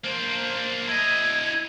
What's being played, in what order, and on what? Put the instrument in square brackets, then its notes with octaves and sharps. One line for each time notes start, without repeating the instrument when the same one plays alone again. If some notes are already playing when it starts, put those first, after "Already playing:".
[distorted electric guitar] A#3 D4 [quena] C5
[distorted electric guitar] E4 D#5 [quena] G#6